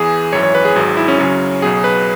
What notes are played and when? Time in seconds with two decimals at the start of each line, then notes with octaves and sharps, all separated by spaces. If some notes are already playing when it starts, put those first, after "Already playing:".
Already playing: E2 E3 G#4
0.33 G#1 F#2 E3 C#5
0.43 C#5
0.55 B4
0.65 G#4
0.76 G#1 G#2 F#3 G#4
0.97 E4
1.08 C#4
1.19 F#2 C#3 F#3 C#4
1.62 B1 B2 F#3 G#4
1.84 B4